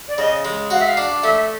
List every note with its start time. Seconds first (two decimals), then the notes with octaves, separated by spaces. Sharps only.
0.08 D5
0.18 C#3 D#5
0.45 G#3
0.70 F#4 F5
0.79 E5
0.86 F5
0.97 D4
1.23 A3 E5